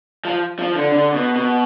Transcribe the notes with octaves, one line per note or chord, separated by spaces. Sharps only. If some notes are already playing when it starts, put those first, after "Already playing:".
F3
F3
D3
D3
B2
B2